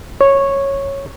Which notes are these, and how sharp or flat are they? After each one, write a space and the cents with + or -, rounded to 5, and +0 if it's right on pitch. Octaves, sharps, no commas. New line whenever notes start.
C#5 -10